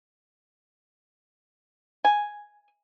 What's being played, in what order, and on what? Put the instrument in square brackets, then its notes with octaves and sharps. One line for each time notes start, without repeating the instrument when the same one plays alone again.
[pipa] G#5